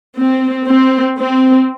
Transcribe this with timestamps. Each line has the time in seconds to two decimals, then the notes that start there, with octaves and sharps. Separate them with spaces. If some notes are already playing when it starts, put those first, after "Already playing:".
0.17 C4
0.68 C4
1.18 C4